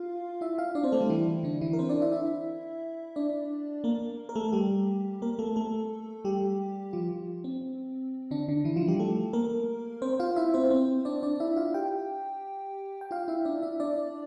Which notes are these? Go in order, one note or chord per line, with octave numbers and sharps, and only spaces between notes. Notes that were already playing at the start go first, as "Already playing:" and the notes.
Already playing: F4 F5
E4 E5
F4 F5
D4 D5
C4 C5
A3 A4
G3 G4
E3 E4
D3 D4
E3 E4
A#4
C4 C5
D4 D5
E4 E5
E4 E5
D4 D5
A#3 A#4
A#4
A3 A4
G3 G4
A#3 A#4
A3 A4
A3 A4
G3 G4
F3 F4
C4
D3 D4
D3 D4
E3 E4
F3 F4
G3 G4
A3 A4
A#3 A#4
C4 C5
F4 F5
E4 E5
C4 C5
C4 C5
D4 D5
D4 D5
E4 E5
F4 F5
G4 G5
G5
F4 F5
E4 E5
D4 D5
E4 E5
D4 D5